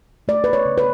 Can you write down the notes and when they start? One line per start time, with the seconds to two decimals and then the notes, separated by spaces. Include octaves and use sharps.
0.28 A3 D5
0.44 B4
0.53 C#5
0.65 C#3
0.78 B4